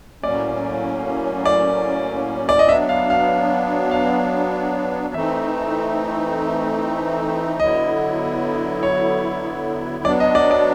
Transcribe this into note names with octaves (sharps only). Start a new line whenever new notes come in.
A2 F#3 A#3 C#4 D5
D5
D5
D#5
F#3 B3 D4 E5
F5
F5
F5
E3 A3 C4 D#4 E5
D3 F#3 B3 E4 D#5
C#5
F#3 B3 D4 D5
D#5
D5
D5